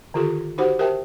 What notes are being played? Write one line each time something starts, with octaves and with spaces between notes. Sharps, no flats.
D3 D#3 F4 G4 A4
D#4 F#4 G4 C5 F#5
G4 A#4 C5 E5 G5 A5